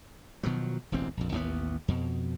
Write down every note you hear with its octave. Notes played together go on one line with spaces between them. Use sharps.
B2 D#3 F3 F#3
E1 A1 D2 C4
A#1 F2
A1 D#2 G3 B3
F2 B2